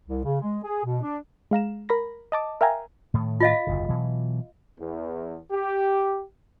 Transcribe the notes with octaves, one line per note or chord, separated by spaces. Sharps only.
C2
C#3
G#3
G#4
B2
D4
G#3 F5 A#5 E7
A#4 B5 A#6
D#5 A5 D6
A#4 E5 F5 G5 G#5 A#5
A2 D#3 A3
F4 D#5 F5
F#1 D#2 C3
B2 E3 F#3
E2
G4